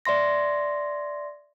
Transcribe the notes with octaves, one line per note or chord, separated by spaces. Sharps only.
D5 E5 C6 A#6